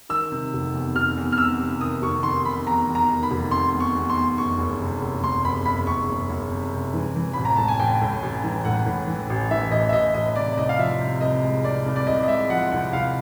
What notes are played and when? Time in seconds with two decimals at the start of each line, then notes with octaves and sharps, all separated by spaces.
0.09 D#3 E6
0.32 C3
0.53 F1
0.74 E2
0.95 F1 F6
1.17 E2
1.32 F6
1.38 C3 E6
1.59 C3
1.81 D#3 D#6
2.02 F1 C#6
2.23 D#3 C6
2.45 C3 B5
2.67 E2 A#5
2.88 E2
2.95 A#5
3.10 D#3
3.23 B5
3.31 F1
3.51 C3 C6
3.73 E2
3.80 C#6
3.95 E2
4.10 C6
4.16 E2
4.38 F#1 C#6
4.58 F#1
4.80 C3
5.01 F#1
5.23 F#1 C6
5.44 F#1 B5
5.65 F#1 B5
5.87 F#1 C#6
6.09 F#1
6.29 F#1
6.51 C3
6.73 C3
6.94 E3
7.16 E3
7.33 A1 B5
7.45 A#5
7.56 A2 A5
7.68 G#5
7.80 A1 G5
8.01 A2
8.22 A1
8.44 E3
8.65 A2 F#5
8.86 A2
9.07 E3
9.30 A1
9.51 E3 E5
9.71 A1 D#5
9.89 E5
9.93 A1 D#5
10.14 A1 D#5
10.36 C3 D5
10.53 D5
10.57 C2 D#5
10.69 F5
10.78 F3 E5
11.00 C3
11.21 C2 D#5
11.42 G#3
11.64 C2 D5
11.86 C2
11.96 D5
12.07 C2 D#5
12.23 D#5
12.28 G#3 E5
12.49 F3 F#5
12.72 C2 F#5
12.92 C2 F5